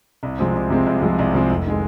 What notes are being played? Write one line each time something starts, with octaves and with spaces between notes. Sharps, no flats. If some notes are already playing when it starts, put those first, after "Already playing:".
C2
C3 F3 G#3 C4
C2
C3 F3 G#3 C4
C2
C3 F3 G#3 C4
C2
C3 F3 G#3 C4
F1
D#3 G#3